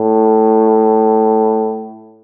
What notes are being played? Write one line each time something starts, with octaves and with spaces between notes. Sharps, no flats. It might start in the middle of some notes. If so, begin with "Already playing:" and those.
Already playing: A2